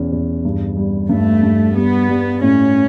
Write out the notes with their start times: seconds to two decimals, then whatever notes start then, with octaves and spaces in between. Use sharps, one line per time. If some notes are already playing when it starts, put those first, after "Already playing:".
Already playing: E2 B2 C#4
0.12 E2
0.45 G2
0.77 G3
1.09 G2 A3
1.43 G2
1.76 G3 B3
2.08 G3
2.41 A2 C#4